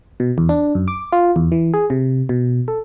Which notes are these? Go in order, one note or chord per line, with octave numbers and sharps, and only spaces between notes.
B2
E2
D4
F#2
D6
F4
E2
E3
G#4
C3
B2
A4